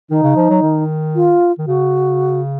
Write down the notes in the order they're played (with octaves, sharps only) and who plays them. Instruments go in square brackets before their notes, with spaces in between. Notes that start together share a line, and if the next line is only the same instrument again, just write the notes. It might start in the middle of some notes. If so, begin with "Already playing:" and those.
[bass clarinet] D#3 [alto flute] D#4
[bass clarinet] C#3
F3
F#3
D#3
[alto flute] F4
[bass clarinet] D#3
[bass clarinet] C#3 [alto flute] F#4